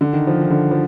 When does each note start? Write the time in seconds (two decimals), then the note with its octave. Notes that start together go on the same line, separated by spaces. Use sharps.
0.01 D3
0.13 D#3
0.27 F3
0.41 D#3
0.51 D3
0.71 F3